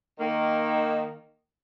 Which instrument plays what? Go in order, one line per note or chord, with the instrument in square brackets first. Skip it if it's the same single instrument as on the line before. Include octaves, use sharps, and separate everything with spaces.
[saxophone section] D#3 A#3